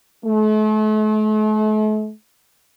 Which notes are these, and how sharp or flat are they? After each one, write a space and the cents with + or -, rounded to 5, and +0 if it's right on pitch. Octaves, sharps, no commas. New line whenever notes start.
A3 -40